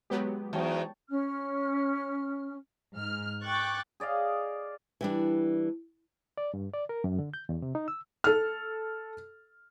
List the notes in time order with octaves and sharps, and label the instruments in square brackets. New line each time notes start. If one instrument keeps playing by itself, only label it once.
[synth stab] F#3 B3 G4 [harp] G#3
[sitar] E2 [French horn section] D#4 F#4 C5 [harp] C#5 G5 A5
[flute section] C#4 F6
[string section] G#2 F6
G5 C#6 D6 F#6 A6
[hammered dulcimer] G#4 D5 D#5 F5
[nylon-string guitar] E3 G3 D4
[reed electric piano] D5
G2
D5
A#4
F#2
D3
G6
E2
C3
D#4
E6
[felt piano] A4 F6